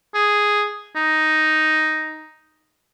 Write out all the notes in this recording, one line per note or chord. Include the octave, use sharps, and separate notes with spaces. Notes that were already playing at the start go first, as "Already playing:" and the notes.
G#4
D#4